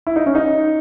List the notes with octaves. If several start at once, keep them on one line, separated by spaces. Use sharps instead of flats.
E4
D#4
C#4
D#4